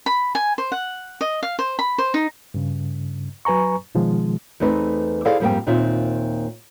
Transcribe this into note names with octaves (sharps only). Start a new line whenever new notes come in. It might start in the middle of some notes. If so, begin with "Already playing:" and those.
B5
G#5
C5
F#5
D#5
F5
C5
B5
C5
D#4
G2 C#3
F#3 B4 G#5 A#5 C#6
B2 D#3 F3 G#3
E2 A3 C4 D#4 B4
E4 G#4 A4 C5 D5 F5
F2 G#2 G3 A#3 F5 G5
D#2 A#2 C4 D#4 F4 E5